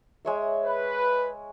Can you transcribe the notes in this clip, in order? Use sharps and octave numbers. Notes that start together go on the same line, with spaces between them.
G#3 C#5 E5
B4